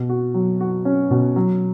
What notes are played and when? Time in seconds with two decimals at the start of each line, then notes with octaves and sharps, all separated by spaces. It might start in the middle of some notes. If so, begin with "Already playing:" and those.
Already playing: B2
0.09 F#4
0.34 F#3
0.60 F#4
0.85 C#4
1.11 B2
1.36 F#3